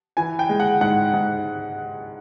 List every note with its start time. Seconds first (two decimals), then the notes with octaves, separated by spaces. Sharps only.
0.17 E3 G#5
0.39 G5
0.49 G#3
0.60 F#5
0.81 G#2 F#5
1.14 G#2